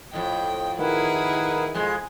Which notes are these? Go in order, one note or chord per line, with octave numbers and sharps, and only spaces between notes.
F2 A2 D#5 G5
D#3 E4 G#4 A#4 B4 F#5
F2 G#3 G#5